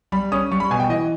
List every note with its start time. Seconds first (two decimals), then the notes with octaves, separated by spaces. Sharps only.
0.12 G3 B5
0.32 C#4 D#6
0.52 G3 C#6
0.60 B5
0.70 B2 G#5
0.80 G5
0.89 E3 D#5